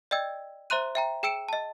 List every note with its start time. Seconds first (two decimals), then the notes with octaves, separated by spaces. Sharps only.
0.11 D5 D#5 G5 E6 G#6
0.70 C5 E5 A#5 C6 F#6 D#7
0.95 E5 G5 A#5
1.23 G#4 G5 E6 C#7 D7 E7
1.49 D#5 A5